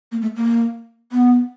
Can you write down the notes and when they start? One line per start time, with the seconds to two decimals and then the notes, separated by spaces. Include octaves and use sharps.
0.12 A#3
0.22 A3
0.37 A#3
1.12 B3